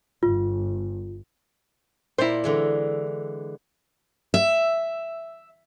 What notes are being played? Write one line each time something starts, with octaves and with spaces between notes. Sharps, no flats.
G1 F4
A#2 E4 C5 D5 A#5
D3 E3 G#3
E5